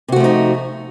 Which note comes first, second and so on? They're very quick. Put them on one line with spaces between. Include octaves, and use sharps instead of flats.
C3 F#4 A3 F3 D#4